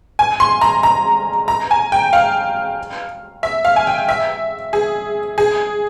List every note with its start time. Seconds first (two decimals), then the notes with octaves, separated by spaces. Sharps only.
0.19 G#5
0.40 C6
0.61 A#5
0.83 A#5
1.48 A#5
1.71 G#5
1.92 G5
2.13 F5
3.43 E5
3.65 F5
3.76 G#5
3.87 G5
4.09 E5
4.73 G#4
5.38 G#4